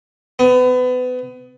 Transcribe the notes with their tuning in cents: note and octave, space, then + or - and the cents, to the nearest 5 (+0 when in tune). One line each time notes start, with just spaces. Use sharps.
B3 +30